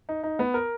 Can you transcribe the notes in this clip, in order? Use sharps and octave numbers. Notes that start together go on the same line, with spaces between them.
D#4
D#4
B3
A#4